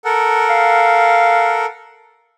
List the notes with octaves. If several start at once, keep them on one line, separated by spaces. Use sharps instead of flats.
A4 A#4 F#5
F5